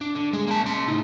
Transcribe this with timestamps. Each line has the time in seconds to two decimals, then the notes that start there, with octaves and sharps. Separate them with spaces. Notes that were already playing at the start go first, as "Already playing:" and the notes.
0.01 D4
0.15 D3
0.33 G#3
0.47 A#3 A5
0.63 C#3 C6
0.88 A2 D#4